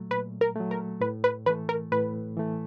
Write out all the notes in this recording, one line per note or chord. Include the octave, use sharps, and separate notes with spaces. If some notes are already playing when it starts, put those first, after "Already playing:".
Already playing: A#2 F#3 A3
A#2 B4
A#4
F#3 A3
A#4
A2 B4
B4
E3 A3 B4
A#4
A2 B4
E3 A3